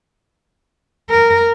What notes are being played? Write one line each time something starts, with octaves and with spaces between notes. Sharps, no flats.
A#4